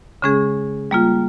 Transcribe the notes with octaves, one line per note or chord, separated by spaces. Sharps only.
C#3 G#3 C#4 G#4
G3 A#3 F4